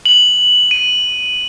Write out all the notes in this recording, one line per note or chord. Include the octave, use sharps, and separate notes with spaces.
F#7
D#7